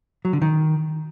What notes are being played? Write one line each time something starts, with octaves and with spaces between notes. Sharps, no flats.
F#3
D3
D#3